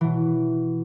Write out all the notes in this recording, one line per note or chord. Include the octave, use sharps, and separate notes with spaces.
B2 E3